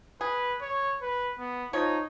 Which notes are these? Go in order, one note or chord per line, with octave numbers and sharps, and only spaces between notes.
G#4 B4
C#5
B4
B3
F3 D#4 C#5